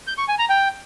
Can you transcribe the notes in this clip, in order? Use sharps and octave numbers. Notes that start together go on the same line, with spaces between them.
G6
C#6
G#5
A#5
G5